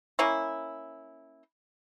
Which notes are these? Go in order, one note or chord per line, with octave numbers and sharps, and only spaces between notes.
A#3 C#4 E4